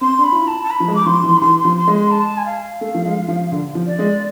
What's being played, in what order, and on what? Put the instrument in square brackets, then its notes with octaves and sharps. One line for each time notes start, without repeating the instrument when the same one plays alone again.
[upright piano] C4 [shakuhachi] C6
[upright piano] D4
[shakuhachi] B5
[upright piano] F4
E4
[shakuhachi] A5
A5
B5
[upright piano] F3
G#3
[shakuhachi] D6
[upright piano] F3 [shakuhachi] C6
[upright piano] E3
[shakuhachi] B5
[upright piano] E3 [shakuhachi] C6
[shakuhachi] C6
[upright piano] F3
[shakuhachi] C6
[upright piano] G#3
[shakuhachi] C6
A5
G#5
F5
[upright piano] A3
F3
G#3
F3
D3
F3
[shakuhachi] D5
[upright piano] G#3